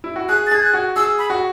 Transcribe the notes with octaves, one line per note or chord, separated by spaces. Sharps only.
E4
F#4
G#4 F#6
A6
G#4 G#6
F#6
F#4
G#4 E6
B5
F#4